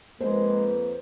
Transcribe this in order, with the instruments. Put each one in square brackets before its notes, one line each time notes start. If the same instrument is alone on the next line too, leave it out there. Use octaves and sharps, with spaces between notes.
[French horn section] F2 A#3 B4 [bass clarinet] G#3 [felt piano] C5